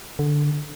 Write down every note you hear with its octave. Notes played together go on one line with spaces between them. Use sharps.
D3